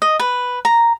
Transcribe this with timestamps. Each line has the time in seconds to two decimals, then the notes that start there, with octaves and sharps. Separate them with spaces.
0.02 D#5
0.20 B4
0.65 A#5